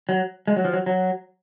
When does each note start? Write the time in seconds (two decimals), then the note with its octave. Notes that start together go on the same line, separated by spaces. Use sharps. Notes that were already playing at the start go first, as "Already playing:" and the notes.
0.09 F#3
0.47 G#3
0.56 F#3
0.65 F3
0.73 F#3
0.86 F#3